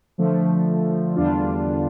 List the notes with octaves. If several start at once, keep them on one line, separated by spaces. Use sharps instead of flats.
D3 F3 A3
E2 D3 G3 D4 F4